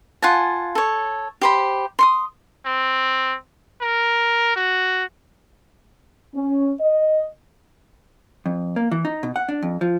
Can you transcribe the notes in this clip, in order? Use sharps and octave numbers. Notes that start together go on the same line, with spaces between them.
F4 F#5 G#5 A5
A4 C#5
G4 C5 B5
C6 C#6 D#6
C4
A#4
F#4
C#4
D#5
F2
A#3
E3
D#4
B2
F#5
D4
F2
F3